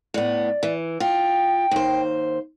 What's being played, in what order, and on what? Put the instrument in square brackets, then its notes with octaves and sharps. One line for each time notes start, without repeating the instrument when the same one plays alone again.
[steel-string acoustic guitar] A2 B3 [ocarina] D5
[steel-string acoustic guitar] E3
[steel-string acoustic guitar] F4 [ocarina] G5
[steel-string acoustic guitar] D#2 C5